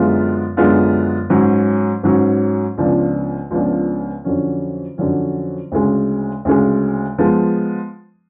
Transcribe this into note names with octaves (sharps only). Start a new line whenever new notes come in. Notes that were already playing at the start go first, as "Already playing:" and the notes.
Already playing: F#2 D3 G#3 B3 F4
F#2 D3 G#3 B3 F4
G#2 F#3 C#4
G#2 F#3 C#4
C#2 C#3 F3 B3 D4
C#2 C#3 F3 B3 D4
F2 D3 F#3 C#4
F2 D3 F#3 C#4
D2 C#3 G#3
D2 C#3 G#3
F3 G#3 B3